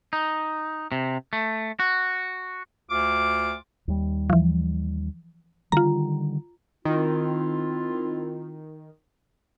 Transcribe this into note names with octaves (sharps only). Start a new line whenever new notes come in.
D#4
C3
A3
F#4
D2 F4 D6
D#2 G3
E3 F3
D3 D#3 G3 F4 A#5
D#3 C4 E4 F4